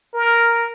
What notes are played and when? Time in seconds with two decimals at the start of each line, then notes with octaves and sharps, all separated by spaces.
0.14 A#4